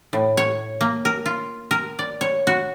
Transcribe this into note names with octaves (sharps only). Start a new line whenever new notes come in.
A2
C#5
A#3
A#4
F4
A#4
D5
C#5
F#4